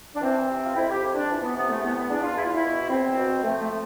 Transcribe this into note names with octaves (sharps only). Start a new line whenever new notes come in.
D4
E3 C4
C3
F4
F2 E4
G4
F2
D4
E3
B3
C3 B3
A3
E2 B3
B3
E2 D4
F4
E2 E4
F4
E4
B2
E2 C4
B2
F3 A3
A3